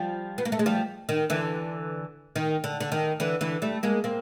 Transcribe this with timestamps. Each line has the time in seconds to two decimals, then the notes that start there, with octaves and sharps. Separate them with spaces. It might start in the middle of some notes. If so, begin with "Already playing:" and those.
Already playing: F3 G3
0.38 B3
0.45 A#3
0.52 A3
0.59 G#3
0.66 F3 G3
1.09 D#3
1.30 D3 E3
2.36 D#3
2.64 D3
2.80 D3
2.92 D#3
3.20 D3 E3
3.41 D3 E3
3.62 G3 A3
3.83 G#3 A#3
4.04 A#3 C4